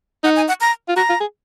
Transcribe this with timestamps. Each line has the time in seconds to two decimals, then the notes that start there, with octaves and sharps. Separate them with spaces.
0.24 D#4 F#5
0.36 G#5
0.48 F#5
0.61 A#5
0.89 F4
0.96 F#4 A#5
1.09 F4
1.21 G#4